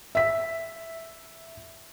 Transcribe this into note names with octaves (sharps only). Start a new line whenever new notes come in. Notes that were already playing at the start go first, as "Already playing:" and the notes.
E5 B6